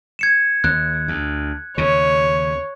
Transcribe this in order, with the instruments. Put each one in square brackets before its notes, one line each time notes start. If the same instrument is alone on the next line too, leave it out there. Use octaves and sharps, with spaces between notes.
[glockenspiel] G#6 C#7 E7
[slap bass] D#2 [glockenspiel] F#6
[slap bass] D2
[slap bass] D#2 C#3 [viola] C#5